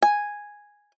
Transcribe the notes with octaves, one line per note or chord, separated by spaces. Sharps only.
G#5